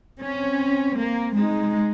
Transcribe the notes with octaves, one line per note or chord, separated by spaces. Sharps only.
C4 C#4
A#3
G#3 D#4